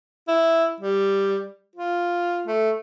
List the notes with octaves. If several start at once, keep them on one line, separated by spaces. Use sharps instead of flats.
E4
G3
F4
A3